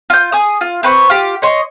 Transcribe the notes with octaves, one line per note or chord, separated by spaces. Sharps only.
F4 G6
G#4 D#6
F4
C4 B4 C#6
F4 G4
C#5 D#5 C6